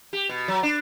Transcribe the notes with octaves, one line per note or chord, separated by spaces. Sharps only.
G4
B2
F#3
D4